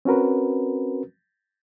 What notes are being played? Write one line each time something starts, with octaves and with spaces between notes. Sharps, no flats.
C4 C#4 F#4 A#4 B4